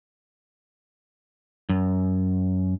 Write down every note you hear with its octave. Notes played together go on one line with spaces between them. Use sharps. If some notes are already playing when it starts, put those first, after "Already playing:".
F#2